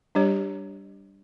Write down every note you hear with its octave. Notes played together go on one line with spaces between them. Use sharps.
G3 D4 G4 C#5